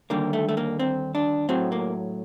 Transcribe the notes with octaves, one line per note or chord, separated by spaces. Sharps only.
D#2 D3 G3 A#3
A3
A3
A#3
C4
D4
A2 F#3 C4
A#3